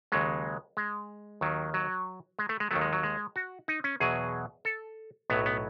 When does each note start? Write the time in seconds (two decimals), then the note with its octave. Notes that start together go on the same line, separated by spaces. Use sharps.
0.12 D#2 C#3 F#3 G#3
0.77 G#3
1.41 D#2 D#3 F#3
1.74 F#3
2.39 G#3
2.49 A3
2.60 G#3
2.71 D#2 D#3 F#3 A3
2.81 G#3
2.93 F#3
3.03 G#3
3.36 F#4
3.68 D#4
3.84 C#4
4.00 E2 B2 F#3 G#4
4.65 A4
5.30 B1 A2 F#3 B3
5.46 B3